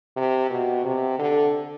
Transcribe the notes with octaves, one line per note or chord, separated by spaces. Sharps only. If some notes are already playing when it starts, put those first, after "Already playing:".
C3
B2
C3
D3